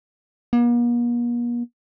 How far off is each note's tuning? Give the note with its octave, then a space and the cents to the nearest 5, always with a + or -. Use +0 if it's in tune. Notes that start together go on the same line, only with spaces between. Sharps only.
A#3 +45